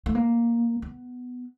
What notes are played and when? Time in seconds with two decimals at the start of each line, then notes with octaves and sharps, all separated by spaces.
0.06 A3
0.15 A#3
0.82 B3